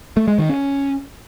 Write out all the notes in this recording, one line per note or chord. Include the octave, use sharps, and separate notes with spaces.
A3
G#3
D#3
C#4